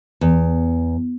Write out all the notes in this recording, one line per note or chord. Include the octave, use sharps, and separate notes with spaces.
E2